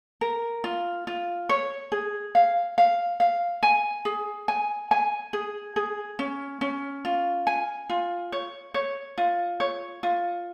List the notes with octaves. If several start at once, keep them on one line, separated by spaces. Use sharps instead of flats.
A#4
F4
F4
C#5
G#4
F5
F5
F5
G#5
G#4
G#5
G#5
G#4
G#4
C#4
C#4
F4
G#5
F4
C#5
C#5
F4
C#5
F4